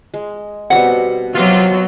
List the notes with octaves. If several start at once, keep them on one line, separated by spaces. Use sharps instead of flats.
G#3
B2 G3 C4 F#5
C3 F#3 B3 F4